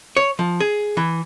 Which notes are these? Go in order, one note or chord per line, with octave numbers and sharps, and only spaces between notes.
C#5
F3
G#4
E3